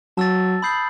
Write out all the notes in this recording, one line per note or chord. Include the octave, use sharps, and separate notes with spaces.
F#3 A5 E6 A6
B5 D#6 G6 C7 F#7